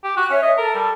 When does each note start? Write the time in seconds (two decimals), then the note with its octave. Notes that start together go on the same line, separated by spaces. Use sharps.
0.04 G4
0.17 F#4 F#6
0.30 C#4 C#5 E5
0.42 D#5 E5
0.57 A4 A#4 A5
0.74 G3